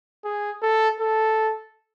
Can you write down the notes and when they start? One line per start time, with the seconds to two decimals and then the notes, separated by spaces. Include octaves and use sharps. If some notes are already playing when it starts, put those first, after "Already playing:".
0.25 G#4
0.62 A4
1.00 A4